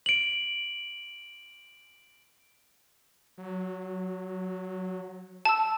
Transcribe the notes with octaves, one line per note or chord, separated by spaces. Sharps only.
D7 F#7
F#3
A5 E6